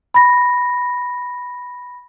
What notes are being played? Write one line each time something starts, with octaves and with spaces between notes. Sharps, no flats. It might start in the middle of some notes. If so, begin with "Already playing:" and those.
B5 A#6